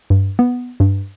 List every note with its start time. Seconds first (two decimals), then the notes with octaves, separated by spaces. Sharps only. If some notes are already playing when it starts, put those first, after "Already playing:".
0.10 G2
0.39 B3
0.80 G2